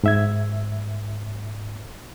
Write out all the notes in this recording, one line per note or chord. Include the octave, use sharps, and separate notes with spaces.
G#2 E5 G#6